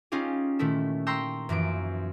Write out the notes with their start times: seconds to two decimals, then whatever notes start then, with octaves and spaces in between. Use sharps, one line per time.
0.12 C#4 D#4 F4 G4 G#4
0.59 A#2 D#3 A3 E4 A4
1.07 G5 A#5 C6 C#6 E6 G6
1.49 F#2 E3 F3 D7